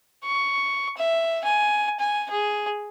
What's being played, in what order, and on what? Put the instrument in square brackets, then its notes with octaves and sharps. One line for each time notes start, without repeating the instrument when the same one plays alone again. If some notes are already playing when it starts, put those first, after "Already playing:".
[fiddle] C#6
E5
G#5
G#5
G#4